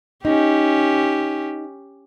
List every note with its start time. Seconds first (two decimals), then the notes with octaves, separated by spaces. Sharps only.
0.25 C#4 D#4 G4